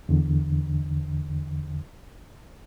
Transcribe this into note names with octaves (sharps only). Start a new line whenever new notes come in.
E2 D3